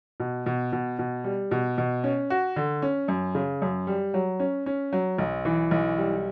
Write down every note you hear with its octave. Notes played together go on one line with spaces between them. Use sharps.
B2
B2
B2
B2
G3
B2
B2
C#4
F#4
D3
C#4
F#2
C#3
F#2
G3
F#3
C#4
C#4
F#3
B1
E3
B1
G3